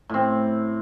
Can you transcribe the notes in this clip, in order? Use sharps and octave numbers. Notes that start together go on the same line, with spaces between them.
A2 C4